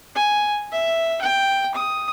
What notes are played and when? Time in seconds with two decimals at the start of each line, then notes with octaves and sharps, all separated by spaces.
0.15 G#5
0.72 E5
1.22 G5
1.75 D#6